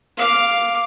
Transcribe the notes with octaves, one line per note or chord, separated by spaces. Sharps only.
F5 D6